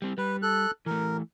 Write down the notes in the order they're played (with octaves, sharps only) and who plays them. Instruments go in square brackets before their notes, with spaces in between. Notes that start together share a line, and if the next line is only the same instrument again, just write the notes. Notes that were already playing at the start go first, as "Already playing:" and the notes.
[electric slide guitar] G3 C4
[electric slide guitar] G3 [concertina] B4
[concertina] A4 F#6
[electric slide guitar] E3 A3 [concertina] A#4